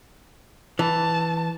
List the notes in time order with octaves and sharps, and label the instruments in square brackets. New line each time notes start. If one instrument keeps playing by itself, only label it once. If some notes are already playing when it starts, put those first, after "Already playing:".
[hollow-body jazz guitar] E3 [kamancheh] A5